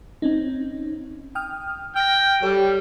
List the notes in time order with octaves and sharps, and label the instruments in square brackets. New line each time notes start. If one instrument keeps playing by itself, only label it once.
[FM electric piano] C4 C#4 D#4
G5 D#6 F6
[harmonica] G5 [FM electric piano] F6 A#6
[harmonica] G3 [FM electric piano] A4 C#5